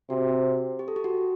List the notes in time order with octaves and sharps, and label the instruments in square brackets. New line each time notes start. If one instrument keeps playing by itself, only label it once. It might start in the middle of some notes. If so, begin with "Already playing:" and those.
[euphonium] C3 [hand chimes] F#4
[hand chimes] G4
A4
G4
F#4